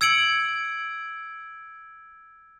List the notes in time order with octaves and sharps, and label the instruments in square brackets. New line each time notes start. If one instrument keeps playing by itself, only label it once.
[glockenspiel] E6 G#6 C#7 D7 F#7